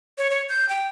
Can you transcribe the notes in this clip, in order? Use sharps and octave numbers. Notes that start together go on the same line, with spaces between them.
C#5
C#5
G6
G5